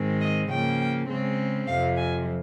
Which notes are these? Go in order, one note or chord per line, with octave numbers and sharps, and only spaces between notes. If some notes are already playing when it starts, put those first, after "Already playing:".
Already playing: G#2 D#3 G#3 C4
D#5
C#3 F3 A#3 G5
C#3 G#3 C4
F2 C3 F3 F5
G#5